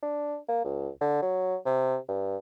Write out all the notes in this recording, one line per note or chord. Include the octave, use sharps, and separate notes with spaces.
D4
A#3
C#2
D3
F#3
C3
G2